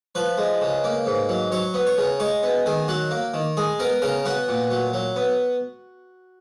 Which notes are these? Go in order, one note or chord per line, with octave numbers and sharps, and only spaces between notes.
F3 B4
G#3
C#3
A#3
G#2
F#3
F#3 C#5
B3
C#5
C#3
G#3 C#5
B3
D#3 G#4
F#3 F#4
A#3
D#3
G#3 G#4
B3 A#4
C#3 A#4
B3 F#4
A#2
F#3
F#3
B3